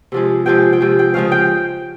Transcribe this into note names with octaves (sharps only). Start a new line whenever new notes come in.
C3 F3 G#3
C3 F3 G#3 G5
G5
C3 F3 G#3
G5
C#3 F3 G#3 F5
G5